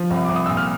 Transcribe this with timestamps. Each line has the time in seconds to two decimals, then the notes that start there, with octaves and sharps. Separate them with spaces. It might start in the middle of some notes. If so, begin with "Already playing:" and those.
Already playing: F3
0.10 C2
0.25 C2 D6
0.35 D#6
0.46 A#2 E6
0.57 F6